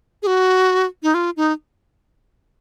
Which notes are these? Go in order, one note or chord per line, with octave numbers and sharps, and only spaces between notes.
G#4
F#4
D#4
F4
D#4